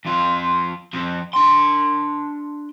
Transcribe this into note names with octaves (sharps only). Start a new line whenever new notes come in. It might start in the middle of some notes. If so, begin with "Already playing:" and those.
F2 F4
F3 C4
D4 C6